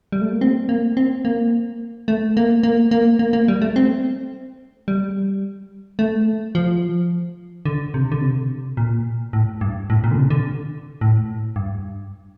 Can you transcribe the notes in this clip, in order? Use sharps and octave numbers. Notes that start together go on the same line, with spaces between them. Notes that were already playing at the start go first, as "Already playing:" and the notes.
G3
A3
A#3
C4
A#3
C4
A#3
A3
A#3
A#3
A#3
A#3
A#3
G3
A3
C4
G3
A3
F3
D3
C3
D3
C3
A#2
A2
G2
A2
A#2
D3
C3
D3
A2
G2